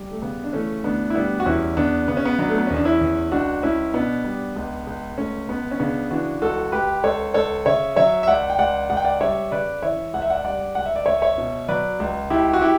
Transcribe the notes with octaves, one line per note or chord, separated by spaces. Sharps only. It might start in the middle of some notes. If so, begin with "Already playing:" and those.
Already playing: G3
A3
C#3 B3
D4
E3 A3 C#4
D2 B3 D4
E4
G3 B3 D4
F#4
E2 C#4 E4
E2 B3 D4
C#3 B3
C#4
B3
F#3 B3 D4
A3
B3
E2 C#4
D4
C#4 E4
E2
C#2 D4 F#4
C#2 C#4 E4
B2 B3 D4
G3
C#2
C#2
C#2 A3 C#4
C#2 B3
C#4
C#3 B3 D4
E3 D4 F#4
C#2 F#4 A4
C#2 G4 B4
C#2 A4 C#5
C#2 A4 C#5
C#3 C#5 E5
F#3 C#5 E5
E5
C#2 D5 F#5
G5
C#2 D5 F#5
C#2 F#5
G5
D5 F#5
G3 C#5 E5
C#3 B4 D5
E3 C#5 E5
C#2 F#5
E5
D5 F#5
G3 D5 F#5
C#2 F#5
E5
D5
C#2 C#5 E5
C#5 E5
B2
F#3 B4 D5
C#2
C#2 E4 G4
F#4
E4 G4